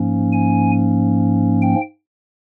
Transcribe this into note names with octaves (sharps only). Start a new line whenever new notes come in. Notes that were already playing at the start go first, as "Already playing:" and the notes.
Already playing: G#2 F3 A#3 C#4
G#5
G5